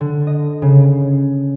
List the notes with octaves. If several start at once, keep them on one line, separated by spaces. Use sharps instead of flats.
D3
D#5
C#3